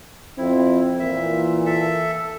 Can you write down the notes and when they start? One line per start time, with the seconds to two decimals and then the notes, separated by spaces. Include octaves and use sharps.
0.38 F2 C4 E4
1.00 A#2 E3 E5
1.66 A4 E5